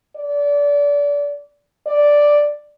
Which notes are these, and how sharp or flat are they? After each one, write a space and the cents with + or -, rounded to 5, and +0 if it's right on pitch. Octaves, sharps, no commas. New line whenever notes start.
D5 -25
D5 +0